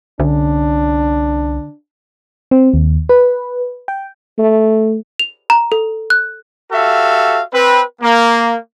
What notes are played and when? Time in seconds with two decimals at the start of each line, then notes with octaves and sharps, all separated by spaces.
0.20 C2 D3 C#4 D4
2.51 C4
2.74 D#2
3.09 B4
3.88 G5
4.39 A3
5.19 F7
5.50 A#5
5.72 A4
6.10 F#6
6.72 F#4 G4 A4 E5 F5
7.53 C4 B4
8.02 A#3